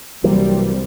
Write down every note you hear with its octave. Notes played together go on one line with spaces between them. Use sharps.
C2 E3 F#3 G3 A#3 C4